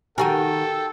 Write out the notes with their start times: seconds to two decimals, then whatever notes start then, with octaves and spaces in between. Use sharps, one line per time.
0.18 D#3 F#4 G4 A4 A#4 G5 G#5